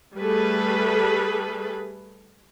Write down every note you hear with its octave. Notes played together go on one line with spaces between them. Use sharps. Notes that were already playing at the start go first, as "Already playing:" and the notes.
G3 A3 G#4 A4 B4